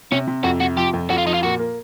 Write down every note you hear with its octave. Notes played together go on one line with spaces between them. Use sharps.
C3 C#4
C3
F2 F#4
C3 F#4
F3 G4
F2
F2 F#4
F4
F3 D#4
F4
A#2 F#4
A#3